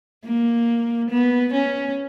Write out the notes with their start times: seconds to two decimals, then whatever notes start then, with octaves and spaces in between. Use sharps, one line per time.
0.25 A#3
1.10 B3
1.53 C#4